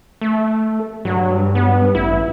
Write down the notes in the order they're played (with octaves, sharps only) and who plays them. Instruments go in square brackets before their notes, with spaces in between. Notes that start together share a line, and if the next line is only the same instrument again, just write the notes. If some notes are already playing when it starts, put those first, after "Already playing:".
[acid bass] A3
[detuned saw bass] G2 [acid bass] F#3
[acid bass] B3
[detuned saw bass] A1 [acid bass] E4